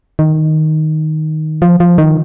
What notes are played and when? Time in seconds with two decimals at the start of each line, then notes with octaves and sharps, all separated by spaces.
0.19 D#3
1.62 F3
1.80 F3
1.98 D#3